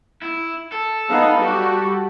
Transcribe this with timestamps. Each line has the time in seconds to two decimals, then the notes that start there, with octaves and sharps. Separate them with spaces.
0.22 E4
0.72 A4
1.09 B3 D#4 F5
1.40 G3 F#4 G4